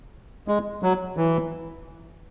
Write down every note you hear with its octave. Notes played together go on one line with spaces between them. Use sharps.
G#3
F#3
E3